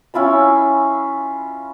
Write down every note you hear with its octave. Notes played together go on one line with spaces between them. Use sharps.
C#4 E4 F4 B5